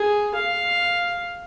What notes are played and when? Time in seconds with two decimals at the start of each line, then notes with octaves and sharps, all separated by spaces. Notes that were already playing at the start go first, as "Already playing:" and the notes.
Already playing: G#4
0.34 F5